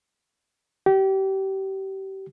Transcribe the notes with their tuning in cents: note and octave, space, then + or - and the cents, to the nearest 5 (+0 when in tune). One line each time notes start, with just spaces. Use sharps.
G4 -30